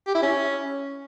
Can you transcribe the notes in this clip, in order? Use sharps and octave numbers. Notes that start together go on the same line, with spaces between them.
G4
E4
C#4